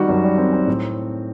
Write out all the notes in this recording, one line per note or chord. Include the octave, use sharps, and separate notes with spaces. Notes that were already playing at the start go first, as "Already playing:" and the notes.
Already playing: D#3 G3 F#4
F#2
G3
C4
C4
A2